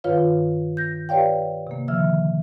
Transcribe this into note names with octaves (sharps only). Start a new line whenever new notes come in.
G2 D#3 F4 B4 C#5 F5
G6 A#6
G4 B4 C#5 D5 F5 G5
C3 A#3
D3 D#3 F3 E5 E6 F6